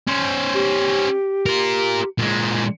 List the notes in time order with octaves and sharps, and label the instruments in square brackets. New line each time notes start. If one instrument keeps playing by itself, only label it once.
[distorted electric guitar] C#4 C5
[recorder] G4
[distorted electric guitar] F4 A#4
A#2 G#3